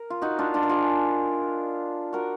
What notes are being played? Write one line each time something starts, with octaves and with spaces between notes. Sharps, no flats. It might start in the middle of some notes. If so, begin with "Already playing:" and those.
Already playing: A#4
F4
D#4 F#4
D4 F4
D4 F4
A#4
F4 G#4
F#4 A#4